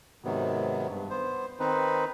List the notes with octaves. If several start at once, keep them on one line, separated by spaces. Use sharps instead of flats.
G#2 C3 D#3 F#3 B3
G2
B3 C5
D#3 C4 D#4 B4